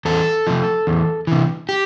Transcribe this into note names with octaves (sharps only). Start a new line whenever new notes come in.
E2 A4
C3 F3
E2
C3 E3
G4